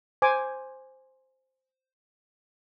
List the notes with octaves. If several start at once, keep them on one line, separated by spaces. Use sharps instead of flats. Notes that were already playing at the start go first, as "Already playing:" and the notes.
C5 G#5 D6